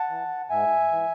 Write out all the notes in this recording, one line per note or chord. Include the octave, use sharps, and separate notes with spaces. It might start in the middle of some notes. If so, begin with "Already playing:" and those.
Already playing: F#5 A5
E3
G#2 E5 G#5
E3